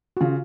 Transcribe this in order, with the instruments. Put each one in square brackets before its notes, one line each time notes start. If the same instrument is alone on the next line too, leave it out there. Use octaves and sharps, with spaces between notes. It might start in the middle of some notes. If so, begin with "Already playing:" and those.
[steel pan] F#4
[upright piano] C#3 [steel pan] F4